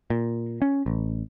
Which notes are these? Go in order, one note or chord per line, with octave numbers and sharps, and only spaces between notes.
A#2
C#4
A1